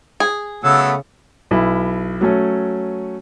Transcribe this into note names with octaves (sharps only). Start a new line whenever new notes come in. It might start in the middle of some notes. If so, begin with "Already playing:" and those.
G#4
C#3 F#3 A3 B3 A4 E6
B1 E4
F#3 A3 C#4